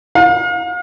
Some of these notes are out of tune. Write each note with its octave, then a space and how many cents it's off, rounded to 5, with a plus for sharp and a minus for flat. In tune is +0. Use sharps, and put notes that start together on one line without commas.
F5 +40